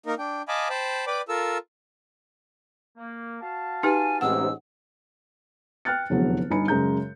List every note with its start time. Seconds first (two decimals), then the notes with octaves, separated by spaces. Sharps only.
0.06 A#3 D#4 A#4
0.18 D4 G5
0.48 D#5 F5 G#5 A5 B5 D6
0.70 C5 G5 A5 B5
1.07 B4 D5 G5 B5 D6
1.29 F4 A4 A#4 E6
2.97 A#3
3.41 F#4 F5 A5
3.83 D#4 G4 B4 G#5
4.21 A1 G#2 C3 F#5 E6
5.85 G5 F6 F#6 A6 C#7
6.10 F1 E2 D3 F#3 B3 G#4
6.50 G1 G2 D#4 G#5 B5 C#7
6.68 F#2 C#3 G#3 A#5 G6